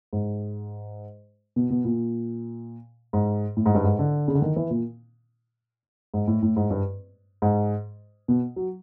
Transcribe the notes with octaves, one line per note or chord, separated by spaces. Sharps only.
G#2
B2
B2
A#2
G#2
A2
G#2
G2
G#2
D3
C#3
D3
D#3
E3
A#2
G#2
A2
A2
G#2
G2
G#2
B2
F#3